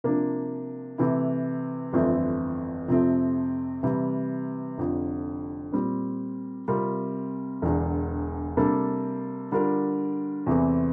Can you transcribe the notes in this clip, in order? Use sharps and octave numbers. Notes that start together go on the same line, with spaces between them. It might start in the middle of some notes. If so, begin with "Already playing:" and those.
C3 F3 A#3 D4
C3 E3 A3 E4
G1 F2 E3 A3 C4
F2 C3 F3 A3 C4
C3 E3 G3
F1 F2 D3
A#2 G3 C4
C3 G3 C4 F4 A#4
E1 E2 D3
C3 G3 A#3 D4 A4
D3 G3 D4 F4 A#4
E2 C3 E3 A3 C4